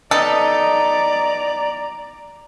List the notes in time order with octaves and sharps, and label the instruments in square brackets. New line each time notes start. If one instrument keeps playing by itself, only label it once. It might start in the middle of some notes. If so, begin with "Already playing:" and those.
[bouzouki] B3 D#4 [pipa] A4 [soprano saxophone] D5 [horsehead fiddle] A#5